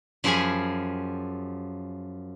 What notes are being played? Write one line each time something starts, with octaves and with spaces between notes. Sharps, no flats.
F#2 F3 G4 G#4 G#5 B5